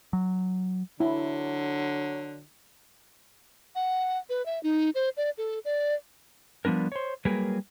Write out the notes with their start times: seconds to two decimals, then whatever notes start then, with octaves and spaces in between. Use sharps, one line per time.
0.13 F#3
1.00 D3 F#3 E4
3.75 F#5
4.29 B4
4.46 E5
4.63 D#4
4.95 C5
5.17 D5
5.38 A4
5.65 D5
6.65 F3 G3 B3 D4 A#4
6.92 C5 C#5
7.25 F#3 G3 A#3 G#4 A#4 B4